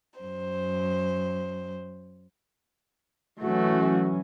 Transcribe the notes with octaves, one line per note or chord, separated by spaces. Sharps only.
F#2 C5
E3 F#3 A3 C#4 F#4